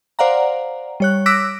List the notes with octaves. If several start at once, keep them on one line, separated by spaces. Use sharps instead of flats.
C5 D5 F5 F#5 A#5
G3 C#5 F#6
D6 E6 F#6 A#6 B6 D7